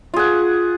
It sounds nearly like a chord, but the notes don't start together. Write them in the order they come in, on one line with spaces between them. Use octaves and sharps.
F4 G#4 F#5